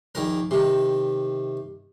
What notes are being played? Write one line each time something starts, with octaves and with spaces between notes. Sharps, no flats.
A#1 D#3 A#4
C3 D#3